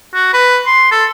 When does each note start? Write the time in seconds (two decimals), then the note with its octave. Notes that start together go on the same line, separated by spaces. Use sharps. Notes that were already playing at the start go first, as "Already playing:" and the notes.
0.14 F#4
0.34 B4
0.66 C6
0.92 A4